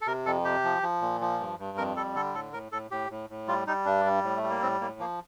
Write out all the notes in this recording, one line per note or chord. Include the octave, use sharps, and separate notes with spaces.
A4
C3 A#4
F2 A4
C3 G4
F3
F3
A#2
F3
G2
G2
F2 A#4
G3 A4
D3 A4
A2 A4
A2 A#4
A2 A4
A2 G4
A2
A2
G3 F4
G3 D#4
G2 D4
G3
A2
A3
G3
A#3
A2 C4
A2 A#3
F3 A#3